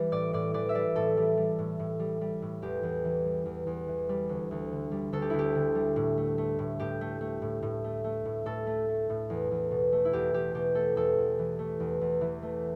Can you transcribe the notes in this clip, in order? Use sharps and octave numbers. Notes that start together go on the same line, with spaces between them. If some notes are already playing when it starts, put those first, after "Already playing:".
Already playing: E3 G3
A2 D5
A2 D5
E3 D5
E5
G3 D5
A2 A4
G3
G3
A2
A2
G3
G3
A2
E2 G4
E2
E3
G3
E2
E2
E3
G3
D2
D2
D3
G3
D2 A4
G4
D2 E4
G4
D3
G3
A2
A3
A3
A2
A2 G4
A3
A3
A2
A2
A3
A3
A2
A2 A4
A3
A3
A2
E2
E2
B2
A3
E4
E2 G4
E2 G4
B2 G4
A3 A4
E2 A4
E2
E3
A3
E2
E2
E3
A3